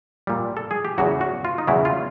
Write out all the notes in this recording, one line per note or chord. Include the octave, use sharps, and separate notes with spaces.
A#2 G3
A4
G#4
G4
E2 C#3 F#3 F#4
F#4
F4
D#4
E2 C#3 F#3 E4
F4